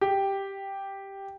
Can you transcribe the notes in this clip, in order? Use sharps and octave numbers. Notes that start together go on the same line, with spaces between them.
G4